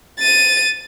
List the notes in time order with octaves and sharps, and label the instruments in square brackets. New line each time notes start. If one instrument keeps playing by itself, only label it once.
[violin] A6 D#7